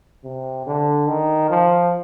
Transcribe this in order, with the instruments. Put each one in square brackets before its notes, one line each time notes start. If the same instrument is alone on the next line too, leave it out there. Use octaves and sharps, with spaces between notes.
[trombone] C3
D3
D#3
F3